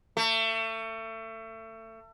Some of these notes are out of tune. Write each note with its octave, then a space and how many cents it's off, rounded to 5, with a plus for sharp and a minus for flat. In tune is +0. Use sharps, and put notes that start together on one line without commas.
A3 +30